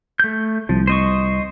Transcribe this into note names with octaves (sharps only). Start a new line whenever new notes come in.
A3 G6
C2 F3
C5 D#5 C#6